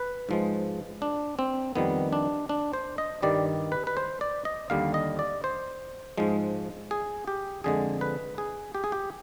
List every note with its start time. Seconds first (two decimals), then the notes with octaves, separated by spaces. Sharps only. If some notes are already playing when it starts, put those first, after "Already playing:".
Already playing: B4
0.29 G#2 F3 G#3
1.02 D4
1.39 C4
1.76 F2 D#3 G3 B3
2.13 D4
2.49 D4
2.73 C5
2.98 D#5
3.22 G2 D#3 G3 D5
3.72 B4
3.87 B4
3.97 C5
4.21 D5
4.45 D#5
4.70 D#2 D3 G3 F5
4.94 D#5
5.19 D5
5.44 C5
6.18 G#2 F3 G#3
6.91 G#4
7.28 G4
7.64 F2 D3 F3 G#3 G#4
8.01 B4
8.38 G#4
8.75 G4
8.84 G#4
8.92 G4